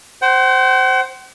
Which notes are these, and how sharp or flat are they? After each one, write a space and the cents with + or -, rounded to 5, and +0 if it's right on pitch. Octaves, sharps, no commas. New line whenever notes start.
C5 +0 F#5 +45